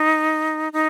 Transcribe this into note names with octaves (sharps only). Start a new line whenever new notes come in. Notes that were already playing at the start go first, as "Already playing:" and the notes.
Already playing: D#4
D#4